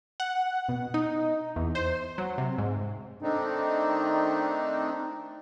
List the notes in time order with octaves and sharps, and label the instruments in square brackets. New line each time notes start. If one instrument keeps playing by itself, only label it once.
[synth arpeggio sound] F#5
B2
D#4
E2
C5
F#3
C3
G#2
[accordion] D#3 A3 C4 D4 D#4